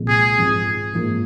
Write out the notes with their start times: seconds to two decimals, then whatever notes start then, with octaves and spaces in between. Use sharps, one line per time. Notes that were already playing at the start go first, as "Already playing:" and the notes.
Already playing: C2 A#2 F3 G#3
0.08 G#4
0.37 G#2 F3 C4
0.93 G#2 F3 A#3